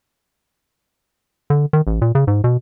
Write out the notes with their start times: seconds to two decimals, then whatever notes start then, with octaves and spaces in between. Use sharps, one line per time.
1.50 D3
1.73 D#3
1.87 A1
2.02 A#2
2.15 C#3
2.27 G#2
2.44 B2